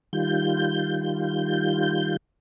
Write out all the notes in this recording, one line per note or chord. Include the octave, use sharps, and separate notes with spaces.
D#3 G3 F4 G6